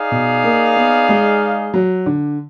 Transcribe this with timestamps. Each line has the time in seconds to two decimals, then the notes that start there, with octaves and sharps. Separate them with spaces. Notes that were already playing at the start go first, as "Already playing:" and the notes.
Already playing: D#4 G#4 D5 F5
0.11 B2
0.44 A#3
0.76 B3
1.09 G#3
1.74 F#3
2.06 D3